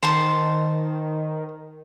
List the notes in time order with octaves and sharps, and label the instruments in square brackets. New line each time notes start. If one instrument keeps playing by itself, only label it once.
[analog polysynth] D#3 [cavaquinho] C5 A5 C6